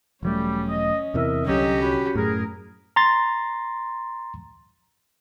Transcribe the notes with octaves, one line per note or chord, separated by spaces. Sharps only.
E1 F#3 G3 A3 C#4
D#5
E2 C3 E3 A#4 D#5 E5
C2 D3 F#3 C#4 G4 D#5
F#4 C#5 B5
F#2 A2 G#4 A#4
A#5 C6 A6